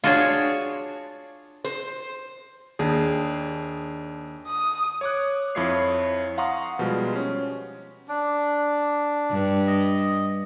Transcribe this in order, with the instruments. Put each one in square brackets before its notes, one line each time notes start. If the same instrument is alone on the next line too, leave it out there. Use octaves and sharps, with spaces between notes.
[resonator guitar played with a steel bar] D4 C#5 [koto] F4 F#4 G#4
[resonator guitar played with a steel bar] C5
[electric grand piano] D#2 D4 G#4
[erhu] D#6
[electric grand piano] C#5 D6 F#6
F2 E4 F4 C#5 D#6 C7
F5 F#5 A#5 C6 C#6 D#6
B2 F3 G3 G#3
C#4
[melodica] D4
[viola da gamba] G2
[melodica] D#5